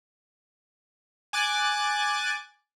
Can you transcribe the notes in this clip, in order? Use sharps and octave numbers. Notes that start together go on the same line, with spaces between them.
G#5 D6 F#6 A6